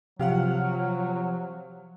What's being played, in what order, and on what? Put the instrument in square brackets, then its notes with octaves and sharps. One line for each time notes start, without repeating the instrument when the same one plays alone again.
[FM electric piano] C3 F6 [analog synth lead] F3 [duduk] F#3 [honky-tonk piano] G4 F5 F#5